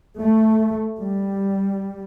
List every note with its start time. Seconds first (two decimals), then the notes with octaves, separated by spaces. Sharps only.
0.20 A3
1.01 G3